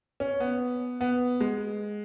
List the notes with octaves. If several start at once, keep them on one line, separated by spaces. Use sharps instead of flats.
C#4
B3
B3
G#3